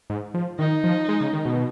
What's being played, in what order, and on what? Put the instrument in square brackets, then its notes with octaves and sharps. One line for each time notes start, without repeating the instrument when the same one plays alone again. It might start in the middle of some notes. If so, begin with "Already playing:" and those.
[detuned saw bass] G#2
F3
[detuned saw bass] D#3 [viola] D#4
[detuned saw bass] F3
G#3
C#3
D#3
B2